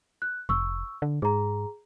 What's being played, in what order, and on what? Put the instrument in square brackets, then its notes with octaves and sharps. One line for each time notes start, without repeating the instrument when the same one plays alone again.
[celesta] F#6
[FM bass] F1 [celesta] C#6 E6
[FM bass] D3
[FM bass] G#2 [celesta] G#4 A#5